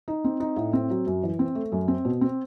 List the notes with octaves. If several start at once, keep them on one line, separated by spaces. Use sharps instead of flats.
D#4
C4
D#4
A2
C4
F#3
F#2
E3
C4
A3
F#2
C4
B2
C4